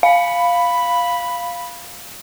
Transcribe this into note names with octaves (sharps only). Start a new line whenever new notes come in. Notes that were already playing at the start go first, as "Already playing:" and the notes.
F5 B5